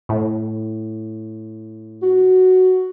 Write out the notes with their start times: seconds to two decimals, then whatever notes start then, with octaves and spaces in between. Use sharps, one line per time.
0.09 A2
2.02 F#4